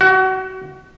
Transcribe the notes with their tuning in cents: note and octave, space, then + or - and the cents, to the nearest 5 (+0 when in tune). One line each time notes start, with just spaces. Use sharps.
F#4 +30